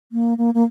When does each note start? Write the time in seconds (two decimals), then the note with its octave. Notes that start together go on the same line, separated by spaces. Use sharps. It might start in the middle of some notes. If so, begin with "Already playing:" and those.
0.12 A#3
0.38 A#3
0.54 A#3